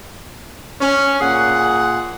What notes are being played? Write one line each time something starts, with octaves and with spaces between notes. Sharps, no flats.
C#4
A#2 G#4 F#5